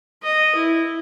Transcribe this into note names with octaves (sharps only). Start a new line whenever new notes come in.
D#5
E4